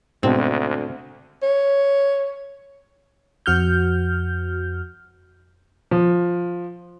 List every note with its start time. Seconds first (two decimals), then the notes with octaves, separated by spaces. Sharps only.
0.23 D2 G#2 B2 C4 D4
1.43 C#5
3.46 F2 F#4 F6 G6
5.91 F3